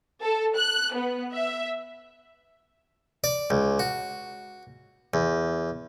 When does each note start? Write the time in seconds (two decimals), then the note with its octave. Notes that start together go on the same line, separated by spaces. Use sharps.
0.21 A4
0.57 F#6
0.95 B3
1.33 E5
3.24 D5
3.50 C#2
3.79 F#4
5.14 E2